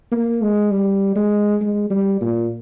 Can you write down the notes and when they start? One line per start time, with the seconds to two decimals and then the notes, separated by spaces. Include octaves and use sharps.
0.12 A#3
0.42 G#3
0.71 G3
1.16 G#3
1.61 G#3
1.90 G3
2.21 A#2